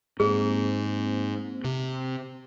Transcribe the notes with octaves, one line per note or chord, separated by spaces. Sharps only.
G#2 A#3 C4 G#4 C5
C3